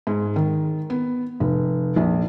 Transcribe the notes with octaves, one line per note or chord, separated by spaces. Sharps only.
G#2
D#3
B3
F1
A#1